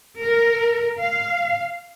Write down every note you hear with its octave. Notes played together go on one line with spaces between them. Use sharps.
A#4
F5